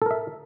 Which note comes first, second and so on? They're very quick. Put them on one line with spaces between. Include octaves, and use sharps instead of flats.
A4 A#4 E5